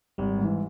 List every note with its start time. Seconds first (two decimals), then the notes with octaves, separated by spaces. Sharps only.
0.18 G#1 G3
0.38 G#2 E3